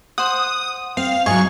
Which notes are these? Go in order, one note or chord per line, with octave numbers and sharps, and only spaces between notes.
C5 F#5 D#6
C4 F5
G#2 F#3 D#5 G#5 C#6